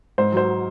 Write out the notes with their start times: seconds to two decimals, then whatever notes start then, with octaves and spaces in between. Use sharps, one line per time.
0.18 G#2 C5
0.32 F#3 C5